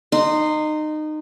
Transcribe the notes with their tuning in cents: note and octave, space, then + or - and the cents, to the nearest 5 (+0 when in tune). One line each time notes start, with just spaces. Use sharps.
D#4 -20 C6 +0